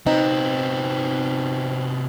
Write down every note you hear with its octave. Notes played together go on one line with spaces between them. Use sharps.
C3 B3 C4 D#4